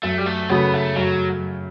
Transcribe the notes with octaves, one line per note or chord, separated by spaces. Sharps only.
F#2 A3
G3
A3
C#3 F#3 A3 B3
A3
F#2 F#3